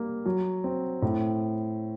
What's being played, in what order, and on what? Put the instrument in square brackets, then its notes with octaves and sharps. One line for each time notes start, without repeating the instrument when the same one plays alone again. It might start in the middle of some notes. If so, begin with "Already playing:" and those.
Already playing: [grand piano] G3 A#3
F#3
C4
A2